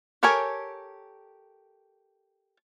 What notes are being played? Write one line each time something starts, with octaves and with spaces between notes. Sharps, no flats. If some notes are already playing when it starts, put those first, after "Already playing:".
G4 A4 A#4 C#5 G#5